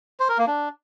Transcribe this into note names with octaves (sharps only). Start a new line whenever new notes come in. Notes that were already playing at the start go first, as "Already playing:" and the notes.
C5
A#4
A#3
D4